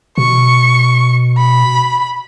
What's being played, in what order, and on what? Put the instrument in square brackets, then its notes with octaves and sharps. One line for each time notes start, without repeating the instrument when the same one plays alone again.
[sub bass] B2 [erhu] C#6
[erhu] B5